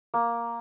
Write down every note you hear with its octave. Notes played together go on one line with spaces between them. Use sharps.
A#3